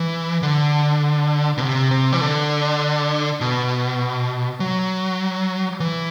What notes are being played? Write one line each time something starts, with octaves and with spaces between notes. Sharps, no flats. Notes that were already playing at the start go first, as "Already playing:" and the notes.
Already playing: E3
D3
B2
C3
C3
E3
D3
B2
F#3
E3